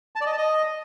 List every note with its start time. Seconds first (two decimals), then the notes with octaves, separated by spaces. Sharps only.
0.16 A5
0.21 D5
0.27 D#5
0.32 A5
0.37 D#5